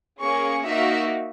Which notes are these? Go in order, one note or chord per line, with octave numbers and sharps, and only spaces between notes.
A#3 C#4 G#4 C#6
A#3 D#4 F#4 E5